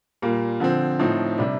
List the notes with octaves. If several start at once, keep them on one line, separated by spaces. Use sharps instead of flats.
A#2 G3 A#3
D3 F3 C4
A2 F3 C4 D#4
C3 G3 D4